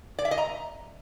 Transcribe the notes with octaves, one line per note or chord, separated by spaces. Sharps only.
D5
E5
D#5
A#5